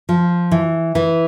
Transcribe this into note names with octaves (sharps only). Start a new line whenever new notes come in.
F3
E3
E3